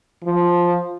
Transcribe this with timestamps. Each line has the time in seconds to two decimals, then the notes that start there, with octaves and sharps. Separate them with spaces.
0.23 F3